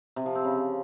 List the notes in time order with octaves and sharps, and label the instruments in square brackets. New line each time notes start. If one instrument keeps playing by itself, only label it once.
[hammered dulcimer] C3
F3
C4
C#3